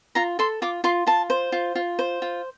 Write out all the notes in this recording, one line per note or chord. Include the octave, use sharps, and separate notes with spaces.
F4 A#5
A4 C6
F4 D6
F4 C6
F4 A5
C5
F4
F4
C5
F4